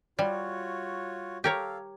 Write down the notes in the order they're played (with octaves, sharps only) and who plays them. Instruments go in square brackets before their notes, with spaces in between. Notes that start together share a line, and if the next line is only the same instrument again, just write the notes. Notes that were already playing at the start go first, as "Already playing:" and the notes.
[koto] G3 [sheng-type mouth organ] F4 F#4 C#5
[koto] G4 A#4 C#5 [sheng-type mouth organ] A4 F5